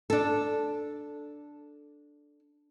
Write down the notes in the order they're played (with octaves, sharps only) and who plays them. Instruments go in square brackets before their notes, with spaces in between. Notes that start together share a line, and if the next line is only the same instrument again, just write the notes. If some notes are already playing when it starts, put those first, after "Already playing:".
[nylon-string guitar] D4 A4